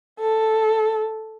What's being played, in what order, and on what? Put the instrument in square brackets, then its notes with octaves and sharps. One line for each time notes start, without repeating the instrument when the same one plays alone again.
[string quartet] A4